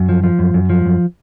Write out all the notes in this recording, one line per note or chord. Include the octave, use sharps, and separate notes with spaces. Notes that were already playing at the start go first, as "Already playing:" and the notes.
Already playing: F#2
F3
F3
F#2
F#2
F3
F#2